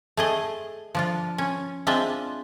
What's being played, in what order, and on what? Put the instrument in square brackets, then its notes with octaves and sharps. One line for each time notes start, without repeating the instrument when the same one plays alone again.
[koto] A3 G#4 D#5
F3 D4 F4
C#4
G#3 C4 D4 F4 D#5 E5